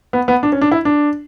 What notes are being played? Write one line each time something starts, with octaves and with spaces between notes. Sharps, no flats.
B3
B3
D4
C#4
D4
E4
D4